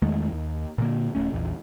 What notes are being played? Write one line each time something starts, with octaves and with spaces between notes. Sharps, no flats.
E2 D#3 G#3 A3
D#2
A#2 D3 A#3
D#1 E2 A3 C#4
A#1 E2